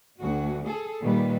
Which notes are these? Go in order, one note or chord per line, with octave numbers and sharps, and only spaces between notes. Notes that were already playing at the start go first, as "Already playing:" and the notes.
D2 F#4
G#4 A4
A#2 D#3 G3 B4